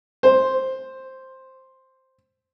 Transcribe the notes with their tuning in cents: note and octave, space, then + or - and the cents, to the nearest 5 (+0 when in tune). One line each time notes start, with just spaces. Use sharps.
C5 +5